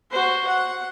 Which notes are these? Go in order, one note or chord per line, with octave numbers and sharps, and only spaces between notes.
F#4 C5
F#5